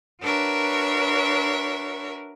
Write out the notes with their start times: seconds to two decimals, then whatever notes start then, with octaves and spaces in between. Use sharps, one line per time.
0.22 D4 F#4 A#4 B4 C#5 E5